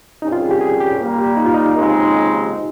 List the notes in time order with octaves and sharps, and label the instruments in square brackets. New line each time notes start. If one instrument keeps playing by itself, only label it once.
[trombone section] C2 C3 G3 C#4 [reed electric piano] D#4
[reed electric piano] F4
G#4
G4
G#4
G4
[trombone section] A#2 G3 A#3
[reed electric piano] G4
D#4
F4
D#4
[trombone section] D#2 C#3 G#3 C4 D#4